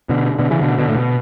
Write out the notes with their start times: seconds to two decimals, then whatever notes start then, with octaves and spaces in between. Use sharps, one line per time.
0.09 B2 D3
0.39 B2 D3
0.50 C#3 E3
0.61 B2 D3
0.78 B2 D3
0.88 A2
0.97 B2